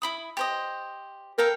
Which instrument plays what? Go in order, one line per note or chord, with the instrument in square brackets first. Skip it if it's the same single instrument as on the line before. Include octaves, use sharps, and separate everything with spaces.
[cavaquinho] E4 B5 D#6
G4 C5 D#5
[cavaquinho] A4 F5 G5 [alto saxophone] A#4